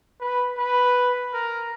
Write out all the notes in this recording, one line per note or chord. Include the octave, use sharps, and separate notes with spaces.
B4
B4
A#4